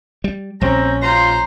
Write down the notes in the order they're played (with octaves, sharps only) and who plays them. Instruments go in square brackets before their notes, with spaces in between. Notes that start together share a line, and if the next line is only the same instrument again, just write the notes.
[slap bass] G3
[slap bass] A#1 G3 [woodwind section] C4 A#5 [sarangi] C#4
[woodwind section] F4 C6 [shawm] C5 [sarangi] A#5